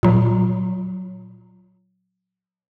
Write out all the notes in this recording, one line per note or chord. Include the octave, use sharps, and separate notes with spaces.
A#2 F#3